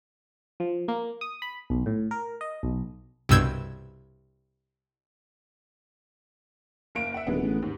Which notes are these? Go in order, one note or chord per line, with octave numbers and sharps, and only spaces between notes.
F3
A#3
D#6
B5
B1
A2
A#4
D#5
B1
C2 G2 B2 E6 G6 G#6
F#1 A#3 D7
E5 F#5
D#1 D3 G#3 B3
A1
D#2 G#2